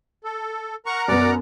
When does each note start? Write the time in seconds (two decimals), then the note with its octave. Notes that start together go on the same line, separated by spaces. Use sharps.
0.24 A4
0.86 A#4 F#5 A#5 C#6
1.08 F#2 B3 D5